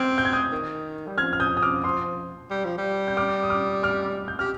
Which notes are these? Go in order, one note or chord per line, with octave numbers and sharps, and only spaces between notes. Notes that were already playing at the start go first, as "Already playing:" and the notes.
Already playing: C4 D6 F6 G#6
G6
G#6
D#6 G6
D#3
G3
F3 F6 G#6
F6
D#6 G6
D#6
D6 F6
C6 D#6
G3
F3
G3
G6
D6 F6
D#6
D6 F6
D6 F6
G6
G4 F6